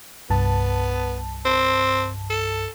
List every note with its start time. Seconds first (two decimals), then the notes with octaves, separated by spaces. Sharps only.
0.30 C2 G2 B3 A5
1.46 C4
2.30 A4